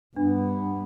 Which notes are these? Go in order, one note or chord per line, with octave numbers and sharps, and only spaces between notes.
G2 B3 D4